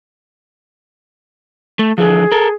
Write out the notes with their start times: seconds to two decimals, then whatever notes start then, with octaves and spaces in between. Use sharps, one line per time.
1.79 A3
1.98 D3 E3 F3 G#4
2.32 A4 A#4